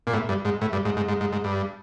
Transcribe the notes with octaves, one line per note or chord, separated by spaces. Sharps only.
A#2
A2
G2
G#2
A2
G2
G#2
G#2
G#2
G#2
G#2
G2